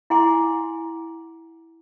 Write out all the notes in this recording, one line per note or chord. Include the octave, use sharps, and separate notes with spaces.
E4 F#5 G#5 C6 D6